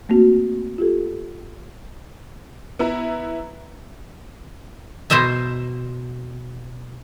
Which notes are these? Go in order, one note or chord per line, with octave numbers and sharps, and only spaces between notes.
A3 A#3 C4 F#4
F4 G4 A4
B3 E4 A#5
B2 C5 D#5 E5 A#5